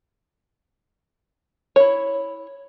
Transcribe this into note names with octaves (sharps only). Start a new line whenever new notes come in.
E4 C#5